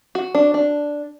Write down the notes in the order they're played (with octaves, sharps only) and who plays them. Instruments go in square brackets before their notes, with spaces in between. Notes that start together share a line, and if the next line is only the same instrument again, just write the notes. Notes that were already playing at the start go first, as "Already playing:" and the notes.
[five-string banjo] F#4
D4
D4